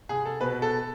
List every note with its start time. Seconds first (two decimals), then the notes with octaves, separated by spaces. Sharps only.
0.09 C2 G#4
0.25 A4
0.41 B2 B4
0.62 A4